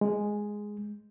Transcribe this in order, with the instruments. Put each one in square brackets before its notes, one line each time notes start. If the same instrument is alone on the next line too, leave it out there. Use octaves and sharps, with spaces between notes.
[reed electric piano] G#3